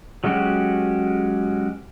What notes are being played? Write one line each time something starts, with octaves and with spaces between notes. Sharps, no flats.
F#3 G#3 C#4 F#4 G4